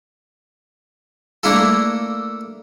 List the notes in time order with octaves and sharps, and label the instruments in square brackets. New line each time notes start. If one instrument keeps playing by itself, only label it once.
[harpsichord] A3 A#3 D4 E4 F4 A4